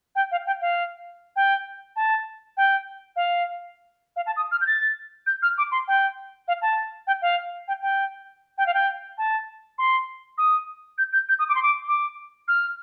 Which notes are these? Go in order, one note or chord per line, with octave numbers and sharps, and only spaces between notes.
G5
F5
G5
F5
G5
A5
G5
F5
F5
A5
D#6
F6
G6
A6
G6
F6
D6
C6
G5
F5
A5
G5
F5
G5
G5
G5
F5
G5
A5
C6
D#6
G6
G6
G6
D#6
D6
C6
D6
D6
F6